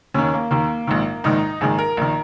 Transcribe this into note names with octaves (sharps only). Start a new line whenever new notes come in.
D#2 D#3 C#4
A#3
D#2 D#3 A#3
A#1 G#2 D#3
A#1 G#2 D#3 D#4
A#1 G#2 D#3 G#4
A#4
A#1 D#3